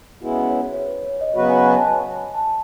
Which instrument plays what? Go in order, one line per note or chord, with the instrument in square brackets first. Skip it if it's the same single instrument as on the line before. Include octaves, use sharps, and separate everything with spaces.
[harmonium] C#3 G#3 B3 E4 [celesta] F#4
[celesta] C#5
C#5
C#5
B4
C#5
D#5
C#5
[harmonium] C#3 F#3 B3 F#4 B4 [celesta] D#5
[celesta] G#5
G#5
A5
A5